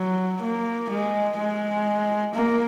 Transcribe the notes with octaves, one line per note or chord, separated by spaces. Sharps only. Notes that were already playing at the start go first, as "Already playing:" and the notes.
Already playing: F#3
A#3
G#3
G#3
A#3